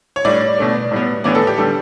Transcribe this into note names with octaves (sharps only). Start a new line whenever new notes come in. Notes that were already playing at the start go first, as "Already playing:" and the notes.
C#5
A2 G3 D4 D5
B2 A3 D4
A2 G3 B3
A2 E3 B3 D4 D5
A4
G4
D3 G3 A4